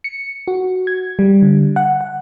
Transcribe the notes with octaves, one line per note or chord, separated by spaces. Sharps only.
C#7
F#4
G#6
G3
D3
F#5
F#5